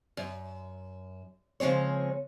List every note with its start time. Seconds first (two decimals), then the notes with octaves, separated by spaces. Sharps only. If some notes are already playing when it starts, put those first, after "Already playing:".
0.17 F#2
1.60 C#3 F3 G#3 C4 C#5